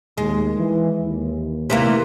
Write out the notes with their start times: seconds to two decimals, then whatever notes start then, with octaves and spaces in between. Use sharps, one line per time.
0.18 D#2 G#3
0.58 E3
1.01 D#2
1.70 C3 E3 A#3